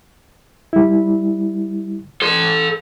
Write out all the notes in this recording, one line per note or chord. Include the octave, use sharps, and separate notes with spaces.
G3 E4
A4 C6